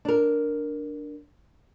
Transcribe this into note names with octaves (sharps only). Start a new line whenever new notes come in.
D4 A#4